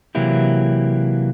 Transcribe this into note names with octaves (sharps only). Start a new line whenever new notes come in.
C3 E3 F#3 A#3 E4 G4